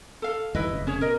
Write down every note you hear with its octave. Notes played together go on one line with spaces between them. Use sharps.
A4 F5
E2 G2 D#3 E4 B4 D#5
F1 C#3
C#4 G#4 C#5
B2 A#4 D#5